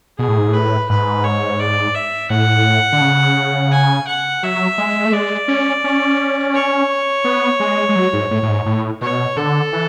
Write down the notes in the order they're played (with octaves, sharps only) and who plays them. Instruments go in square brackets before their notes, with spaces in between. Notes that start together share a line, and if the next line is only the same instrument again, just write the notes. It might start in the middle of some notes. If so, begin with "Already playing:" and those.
[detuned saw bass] B2 [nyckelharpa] G#4
[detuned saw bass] A2
G#2
A2
[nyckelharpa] B4
[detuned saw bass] G#2 [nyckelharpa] B4
[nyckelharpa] C#5
D5
E5
[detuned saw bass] A2 [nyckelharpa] F#5
[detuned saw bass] D3
C#3
[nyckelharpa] G#5
F#5
[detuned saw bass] F#3 [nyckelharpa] E5
[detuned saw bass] G#3
A3
[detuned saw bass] G#3 [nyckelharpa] D5
[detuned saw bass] C#4
C#4
[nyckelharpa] C#5
[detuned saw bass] B3
G#3
G#3
F#3
G#2
A2
A2
G#2
A2
[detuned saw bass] B2 [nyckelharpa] C#5
[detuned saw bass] D3 [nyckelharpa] A4
[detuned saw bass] E3